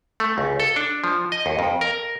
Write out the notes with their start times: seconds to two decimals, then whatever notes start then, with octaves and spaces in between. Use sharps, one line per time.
0.20 A3
0.38 C#2
0.60 A4
0.76 D4
1.04 F3
1.32 D#5
1.46 D#2
1.59 F2
1.81 A#4